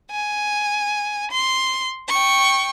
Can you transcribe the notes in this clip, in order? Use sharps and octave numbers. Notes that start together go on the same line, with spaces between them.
G#5
C6
G5 C#6